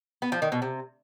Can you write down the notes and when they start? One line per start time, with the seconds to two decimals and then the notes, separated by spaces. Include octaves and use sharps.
0.22 B3
0.32 F3
0.42 D#3
0.52 B2
0.62 C3